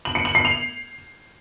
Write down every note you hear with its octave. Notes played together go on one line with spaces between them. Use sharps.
F#7
C#7
F#7
C7
F7